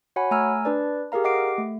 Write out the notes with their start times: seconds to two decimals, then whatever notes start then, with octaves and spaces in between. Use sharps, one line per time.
0.16 F#4 C#5 F#5 G#5 B5
0.31 A3 G#5 A#5 E6 F6
0.65 D4 B4 D5
1.12 G4 G#4 A#4 F5 A#5
1.24 G4 D#5 F#5 D6 C7 D7
1.58 A3